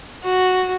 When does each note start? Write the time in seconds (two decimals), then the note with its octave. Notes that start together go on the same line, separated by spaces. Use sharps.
0.24 F#4